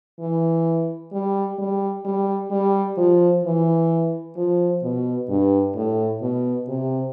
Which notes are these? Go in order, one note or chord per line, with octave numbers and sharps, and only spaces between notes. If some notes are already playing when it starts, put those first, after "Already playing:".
E3
G3
G3
G3
G3
F3
E3
F3
B2
G2
A2
B2
C3